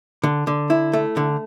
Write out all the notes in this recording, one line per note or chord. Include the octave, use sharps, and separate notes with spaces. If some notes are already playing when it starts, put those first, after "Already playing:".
D3
D3
E4
A3
D3